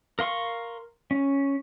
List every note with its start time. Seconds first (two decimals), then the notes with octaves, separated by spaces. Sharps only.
0.19 A#4 F5 C6 C#6
1.11 C#4